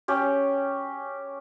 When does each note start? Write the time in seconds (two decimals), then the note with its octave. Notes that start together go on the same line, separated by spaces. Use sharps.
0.08 C#4 G4